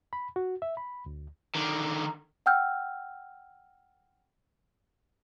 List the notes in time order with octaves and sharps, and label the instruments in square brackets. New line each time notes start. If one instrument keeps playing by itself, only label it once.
[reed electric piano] B5
F#4
E5
B5
D2
[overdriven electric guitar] D3 D#3
[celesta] F#5 G5 E6 F6 G6